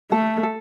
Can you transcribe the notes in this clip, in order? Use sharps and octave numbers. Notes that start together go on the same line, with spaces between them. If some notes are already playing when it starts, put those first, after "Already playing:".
A3 A4
A4